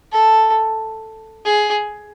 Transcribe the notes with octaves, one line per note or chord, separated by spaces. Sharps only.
A4
G#4